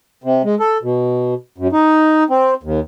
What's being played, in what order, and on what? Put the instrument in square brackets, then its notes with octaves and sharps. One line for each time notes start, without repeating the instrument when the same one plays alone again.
[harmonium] C3
G#3
A4
B2
F#2
D#4
C4
D#2